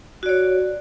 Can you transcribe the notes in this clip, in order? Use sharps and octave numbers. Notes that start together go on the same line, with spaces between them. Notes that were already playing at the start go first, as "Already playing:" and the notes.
F#4 C#5 D5